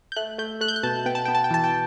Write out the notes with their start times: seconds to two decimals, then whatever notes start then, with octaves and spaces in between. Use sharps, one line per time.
0.12 G6
0.16 A3 F#6
0.38 A3 G6
0.61 A3 F#6
0.68 G6
0.76 F#6
0.83 B2 A5
1.06 B3 G5
1.15 A5
1.25 B3 G5
1.35 A5
1.44 G5
1.51 E3 A5
1.64 G5